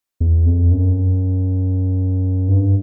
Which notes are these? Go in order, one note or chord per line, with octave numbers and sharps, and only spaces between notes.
E2
F2
F#2
G2